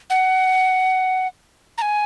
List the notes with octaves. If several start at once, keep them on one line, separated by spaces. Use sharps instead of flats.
F#5
A#5
G#5